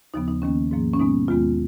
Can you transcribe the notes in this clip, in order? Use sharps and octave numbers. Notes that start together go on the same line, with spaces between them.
D#2 C#3 F3 B3 D#4
D#4
D#2 D#3 A#3 C#4
G#2 F3 A#3
C#4
B2 G#3 B3 D#4
D#2 D#3 G#3 B3 F4